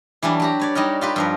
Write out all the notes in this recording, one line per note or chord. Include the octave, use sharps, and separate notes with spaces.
E3 F#3 G3 D4
F#3 G4 A#5
B4 C#5 D5
G3 D#4 F#4 A#4
F4 G4 B4
G2 F3 A#4